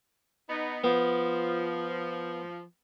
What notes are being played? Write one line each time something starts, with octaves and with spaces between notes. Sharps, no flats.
B3 D#4
F3 B3